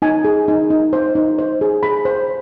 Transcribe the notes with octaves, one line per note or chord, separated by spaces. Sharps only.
D#4 G#5
G#4
D#4
D#4
C5
D#4
C5
G#4
G#4 B5
C5